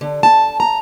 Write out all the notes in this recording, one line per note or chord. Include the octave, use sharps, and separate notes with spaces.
D3
A5
A#5